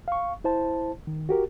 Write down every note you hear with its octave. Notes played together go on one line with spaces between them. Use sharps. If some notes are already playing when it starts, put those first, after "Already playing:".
F5 C#6
E4 C5 A5
D#3
F#4 G4 A#4